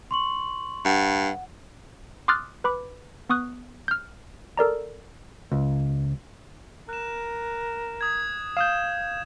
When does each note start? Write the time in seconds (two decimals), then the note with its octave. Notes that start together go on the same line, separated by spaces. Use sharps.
0.11 C6 C#6 F#7
0.85 G2 F#5
2.28 C6 D6 D#6 F6 F#6 A6
2.64 B4 B5 D6
3.30 B3 C#6 D#6 F#6
3.88 F6 G6
4.57 A4 A#4 D5 A#5
5.52 C#2
6.89 A#4 F#6 E7
8.01 D#6 G#6
8.57 F5 D#6 G6 E7